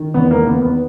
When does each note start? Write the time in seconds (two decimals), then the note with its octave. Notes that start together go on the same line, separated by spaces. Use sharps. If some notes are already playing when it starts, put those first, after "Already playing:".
Already playing: D#3
0.14 E2 B3
0.31 A#3
0.46 D#3 B3
0.62 B3